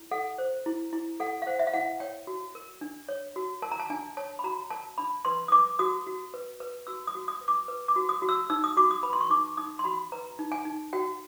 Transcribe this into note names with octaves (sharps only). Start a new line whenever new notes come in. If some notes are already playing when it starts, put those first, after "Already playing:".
Already playing: E4
A4 F#5
C5
E4
E4
A4 F#5
F5
C5 F#5
E5
F5
E4 F#5
C#5 G5
F#4
A#4
D4
C#5
F#4
A#4 A5
A#5
A5
D4 G#5
C#5 A5
B5
F#4 A#5
A#4 A5
D4 B5
B4 C6
D#6
B4 D6
F#4 D#6
F#4
B4
B4
F#4 E6
D#6
F#4
D#6
B4
D6
B4
D6
F#4
D#6
F#4
E6
D#4 E6
D#6
F#4 D6
D#6
B4 B5
C6
C#6
D#4 D6
D#4 D#6
C6
F#4 B5
B4 A#5
D#4
G#5
D#4
F#4 G5